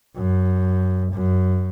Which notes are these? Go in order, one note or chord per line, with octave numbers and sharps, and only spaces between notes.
F#2
F#2